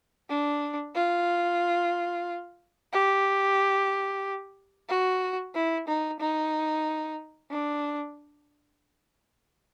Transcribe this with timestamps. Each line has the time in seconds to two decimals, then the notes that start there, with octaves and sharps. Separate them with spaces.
0.29 D4
0.95 F4
2.92 G4
4.89 F#4
5.55 E4
5.88 D#4
6.20 D#4
7.51 D4